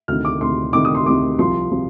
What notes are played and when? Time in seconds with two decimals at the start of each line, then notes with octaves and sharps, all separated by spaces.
0.08 D2 C3 D#3 F6
0.25 D6
0.41 D2 C3 D#3 C6
0.73 D2 C3 D#3 D6
0.85 D#6
0.95 C6
1.06 D2 C3 D#3 D6
1.39 C2 C3 F3 C6
1.71 C3 F3